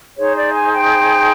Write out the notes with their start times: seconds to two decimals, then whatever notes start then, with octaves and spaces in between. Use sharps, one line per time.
0.17 D#4 G#4 C5 C#5
0.36 D5
0.53 G#5
0.72 G5